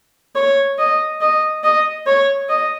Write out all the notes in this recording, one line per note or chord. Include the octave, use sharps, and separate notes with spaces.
C#5
D#5
D#5
D#5
C#5
D#5